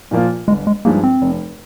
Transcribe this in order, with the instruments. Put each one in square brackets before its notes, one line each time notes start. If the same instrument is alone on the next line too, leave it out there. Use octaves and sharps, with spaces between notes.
[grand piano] A#2 F3 A#3 F4
[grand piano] G1 [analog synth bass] G#3
[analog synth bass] G#3
[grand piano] G2 F3 G#3 D#4 [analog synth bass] A#3
[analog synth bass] C4
[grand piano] F1